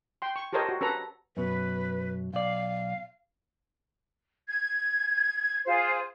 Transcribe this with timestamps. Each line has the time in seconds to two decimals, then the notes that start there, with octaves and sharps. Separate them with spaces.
0.22 G5 C6
0.36 C#6
0.53 G4 A4 A#4 C5 C#5 D#5
0.69 F#4
0.81 C#4 A4 B4 A#5
1.37 F#2 B2 B4
2.34 B1 D5 F5
4.47 G#6
5.66 F4 G#4 C5